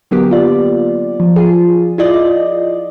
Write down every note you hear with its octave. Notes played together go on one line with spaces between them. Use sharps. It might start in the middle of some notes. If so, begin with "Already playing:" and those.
D3 F#3 A#3 B3 G4
F4 D5
F3
F4 G#4
E4 F4 D5 D#5